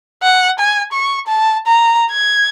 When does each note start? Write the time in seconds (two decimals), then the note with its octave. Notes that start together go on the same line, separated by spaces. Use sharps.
0.23 F#5
0.59 G#5
0.93 C#6
1.27 A5
1.66 A#5
2.11 G#6